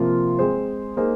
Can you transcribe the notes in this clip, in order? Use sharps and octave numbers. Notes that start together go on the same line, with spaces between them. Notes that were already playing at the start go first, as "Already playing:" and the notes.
Already playing: C3 F3 A#3 F4
G#3 C4 G#4 C5
A#3 D#4 G#4 C5